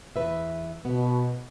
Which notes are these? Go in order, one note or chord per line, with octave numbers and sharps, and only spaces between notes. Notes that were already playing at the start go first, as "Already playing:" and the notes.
E2 B4 E5
B2 B3